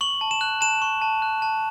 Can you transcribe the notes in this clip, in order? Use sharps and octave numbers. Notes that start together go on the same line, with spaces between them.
C#6 F#7
A5
E7
F#6
A5 E7
C#6
A5
F#6
A5